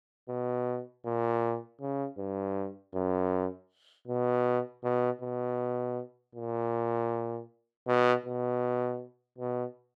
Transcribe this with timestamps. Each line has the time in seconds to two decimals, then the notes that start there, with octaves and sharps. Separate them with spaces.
0.29 B2
1.05 A#2
1.81 C#3
2.18 G2
2.94 F#2
4.07 B2
4.84 B2
5.22 B2
6.35 A#2
7.87 B2
8.25 B2
9.38 B2